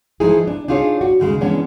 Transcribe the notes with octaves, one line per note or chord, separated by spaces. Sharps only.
E3 F3 G#3 D#4 E4 G#4
D4
D4 D#4 F4 G#4 C#5
F#4
D#2 C#3 G#3
E3 G#3 B3 C#4 D4